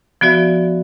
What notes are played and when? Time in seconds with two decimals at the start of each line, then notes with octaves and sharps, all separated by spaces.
0.21 F3 B3 F#4 D5 E5